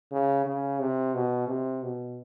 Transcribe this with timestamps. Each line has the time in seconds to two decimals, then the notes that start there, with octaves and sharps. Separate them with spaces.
0.12 C#3
0.46 C#3
0.80 C3
1.14 B2
1.47 C3
1.83 B2